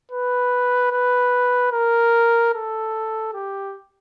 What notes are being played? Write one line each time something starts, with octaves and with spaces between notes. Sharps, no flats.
B4
B4
A#4
A4
G4